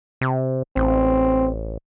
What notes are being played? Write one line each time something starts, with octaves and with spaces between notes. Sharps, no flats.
C3
A1 C4